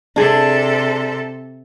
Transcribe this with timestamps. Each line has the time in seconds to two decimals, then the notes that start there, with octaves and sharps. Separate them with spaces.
0.16 C3 D4 G#4 A4